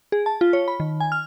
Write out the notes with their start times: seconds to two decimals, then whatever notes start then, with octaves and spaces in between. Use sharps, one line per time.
0.12 G#4
0.26 A5
0.41 F4
0.53 C#5
0.68 B5
0.80 D#3
1.00 G#5
1.12 F6